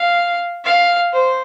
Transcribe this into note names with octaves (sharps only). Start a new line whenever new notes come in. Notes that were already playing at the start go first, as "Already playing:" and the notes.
Already playing: F5
F5
C5